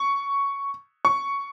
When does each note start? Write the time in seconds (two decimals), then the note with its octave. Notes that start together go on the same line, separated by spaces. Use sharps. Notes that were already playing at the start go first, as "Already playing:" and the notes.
Already playing: C#6
1.05 C#6